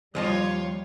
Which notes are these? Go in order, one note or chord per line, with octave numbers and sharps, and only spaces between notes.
D#2 F3 G3 F4 C#5 D#5